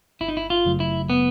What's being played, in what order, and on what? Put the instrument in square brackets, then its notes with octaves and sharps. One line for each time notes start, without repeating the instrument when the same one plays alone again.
[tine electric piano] G1 [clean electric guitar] E4
[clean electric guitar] D#4
E4
F4
[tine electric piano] F#2 C#3 F#3 A3
[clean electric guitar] E4
B3